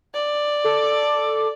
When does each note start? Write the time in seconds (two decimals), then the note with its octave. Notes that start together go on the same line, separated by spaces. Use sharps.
0.14 D5
0.64 A4 D6